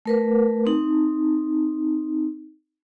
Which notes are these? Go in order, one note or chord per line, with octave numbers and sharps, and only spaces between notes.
A3 A#4 B4
C4 D#4